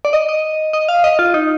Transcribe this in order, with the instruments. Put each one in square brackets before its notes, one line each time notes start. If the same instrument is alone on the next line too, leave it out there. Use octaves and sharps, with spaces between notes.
[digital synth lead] D5
D#5
D#5
D#5
F5
D#5
F4
D#4